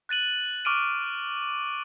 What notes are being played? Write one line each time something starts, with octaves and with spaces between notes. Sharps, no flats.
F#6 A6 D#7 F#7
C#6 D6 F6 D7 D#7